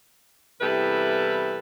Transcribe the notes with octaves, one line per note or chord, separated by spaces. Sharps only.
E2 C3 G3 E4 A4 B4